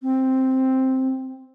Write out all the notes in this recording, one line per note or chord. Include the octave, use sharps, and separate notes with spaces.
C4